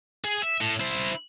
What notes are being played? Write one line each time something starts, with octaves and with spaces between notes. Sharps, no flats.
G#4
E5
A2
E4 C5